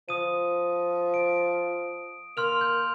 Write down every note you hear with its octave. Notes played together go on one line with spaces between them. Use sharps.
F3 D#6 D#7
D7
A#3 C6 F6 F7
G6